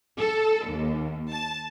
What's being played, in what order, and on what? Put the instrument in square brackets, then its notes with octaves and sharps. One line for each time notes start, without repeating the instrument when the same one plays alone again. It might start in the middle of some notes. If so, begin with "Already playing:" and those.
[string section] A4
D#2
A5